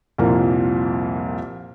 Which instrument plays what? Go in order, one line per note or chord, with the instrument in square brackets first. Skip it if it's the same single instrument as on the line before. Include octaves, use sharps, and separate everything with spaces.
[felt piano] C2 F2 A#2 A#3